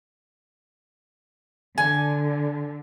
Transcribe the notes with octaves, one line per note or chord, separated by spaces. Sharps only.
D3 G#5